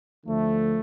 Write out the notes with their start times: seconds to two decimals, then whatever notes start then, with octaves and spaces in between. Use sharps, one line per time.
0.24 D2 D3 F3 A3